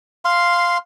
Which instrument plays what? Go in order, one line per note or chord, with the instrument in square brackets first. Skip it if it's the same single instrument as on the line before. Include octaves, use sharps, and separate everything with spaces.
[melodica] F5 C6